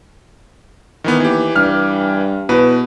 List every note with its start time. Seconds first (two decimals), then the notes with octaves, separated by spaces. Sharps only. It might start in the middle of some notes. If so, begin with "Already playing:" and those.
1.04 D#3 E3 B3
1.20 D#2 E3 G4
1.56 G2 F6
2.49 E2 B2 B4